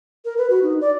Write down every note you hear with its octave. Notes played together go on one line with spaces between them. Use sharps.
A#4
B4
F#4
D#4
D5